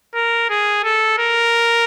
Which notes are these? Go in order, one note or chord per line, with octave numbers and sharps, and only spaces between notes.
A#4
G#4
A4
A#4